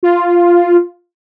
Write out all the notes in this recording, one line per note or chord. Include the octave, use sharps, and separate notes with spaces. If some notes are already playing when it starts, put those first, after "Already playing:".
F4